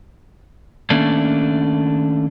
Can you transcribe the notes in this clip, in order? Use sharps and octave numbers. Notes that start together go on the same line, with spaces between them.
D#3 A3 A#3 C#4 D4